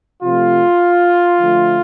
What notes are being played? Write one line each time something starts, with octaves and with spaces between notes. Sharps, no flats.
C3 F3 A3 F4
D3 F3 A3